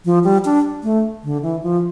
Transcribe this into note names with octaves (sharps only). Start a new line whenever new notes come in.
F3
G3
D4
A3
D3
E3
F3